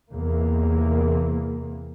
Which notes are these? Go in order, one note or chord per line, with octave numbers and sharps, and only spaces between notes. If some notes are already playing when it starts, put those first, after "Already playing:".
E2 C3 A#3